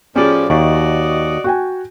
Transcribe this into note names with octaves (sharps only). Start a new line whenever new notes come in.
A2 F3 C#4 G4 G#4 D5
D#2 F#4 D5 D#5 C#6
F#4 G5 G#5